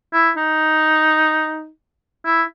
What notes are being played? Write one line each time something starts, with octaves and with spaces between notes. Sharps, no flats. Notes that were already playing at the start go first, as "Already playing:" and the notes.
E4
D#4
E4